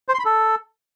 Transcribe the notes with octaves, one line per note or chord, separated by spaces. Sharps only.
C5
C6
B5
A4